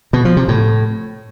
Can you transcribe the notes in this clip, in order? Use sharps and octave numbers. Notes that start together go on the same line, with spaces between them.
B2
F3
C3
A2